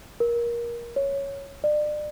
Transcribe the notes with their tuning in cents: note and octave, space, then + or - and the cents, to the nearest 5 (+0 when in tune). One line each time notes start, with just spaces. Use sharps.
A#4 +20
C#5 +5
D5 +35